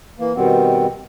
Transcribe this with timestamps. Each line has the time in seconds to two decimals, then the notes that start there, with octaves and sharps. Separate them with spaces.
0.19 E3 A#3
0.36 B2 D#3 G3 B3 C4